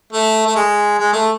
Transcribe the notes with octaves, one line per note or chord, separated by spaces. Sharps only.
A3
A3
G#3
G#3
A3